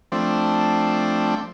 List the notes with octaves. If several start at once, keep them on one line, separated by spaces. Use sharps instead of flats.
F3 A3 C4 D4